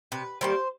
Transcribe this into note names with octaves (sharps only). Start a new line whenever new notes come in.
C3 B4
D#3 G3 A#3 C5